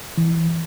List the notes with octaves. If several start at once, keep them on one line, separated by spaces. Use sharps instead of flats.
E3